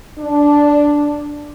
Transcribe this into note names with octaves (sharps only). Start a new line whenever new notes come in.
D4